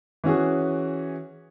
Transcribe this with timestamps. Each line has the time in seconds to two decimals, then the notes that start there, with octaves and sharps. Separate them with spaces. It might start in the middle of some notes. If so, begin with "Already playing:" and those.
0.24 E3 C#4 F#4 G#4